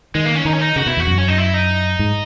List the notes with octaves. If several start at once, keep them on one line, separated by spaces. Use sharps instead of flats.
D#3 G#3
A#3
C#4
D#3 D#4
C#4
D#4
C#3 F#4
B2 E4
E2 F#4
F#2
C#4
D#4
E4
D#4
G#2